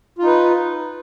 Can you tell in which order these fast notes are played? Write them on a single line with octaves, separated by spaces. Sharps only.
F4 D#4 B4